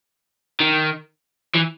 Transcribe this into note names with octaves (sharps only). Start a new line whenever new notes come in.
D#3
E3